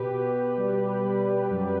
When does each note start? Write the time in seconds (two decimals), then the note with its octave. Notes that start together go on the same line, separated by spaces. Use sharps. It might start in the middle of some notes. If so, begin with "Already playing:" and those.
Already playing: B2 G4 B4
0.11 B2
0.57 G3
1.03 G3
1.50 F#2